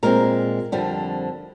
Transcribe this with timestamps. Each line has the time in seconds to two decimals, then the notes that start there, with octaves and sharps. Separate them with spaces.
0.03 A#2 G#3 C4 A#4
0.72 F2 D3 G3 C4